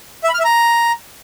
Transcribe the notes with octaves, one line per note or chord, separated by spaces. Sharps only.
E5
B5
F6
E5
A#5